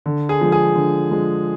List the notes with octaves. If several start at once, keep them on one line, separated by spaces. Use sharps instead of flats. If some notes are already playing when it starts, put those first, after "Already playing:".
D3
G#4
F3 G#3
G#4
D3
F3 G#3